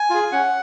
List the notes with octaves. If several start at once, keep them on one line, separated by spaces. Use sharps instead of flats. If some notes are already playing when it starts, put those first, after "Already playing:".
Already playing: G#5
F4 G#4
C#4 F#5